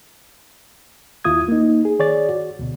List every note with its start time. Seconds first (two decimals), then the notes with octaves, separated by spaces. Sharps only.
1.24 D#2 E4 F4 D#6 G#6
1.48 A#3 D#4
1.85 G#4
1.99 D#3 G#4 C#5 D5 A6
2.29 F#4
2.59 D2 B2